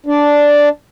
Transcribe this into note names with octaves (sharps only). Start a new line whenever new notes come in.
D4